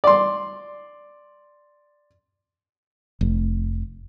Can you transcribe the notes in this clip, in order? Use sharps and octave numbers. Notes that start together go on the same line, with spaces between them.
D5 C6
F1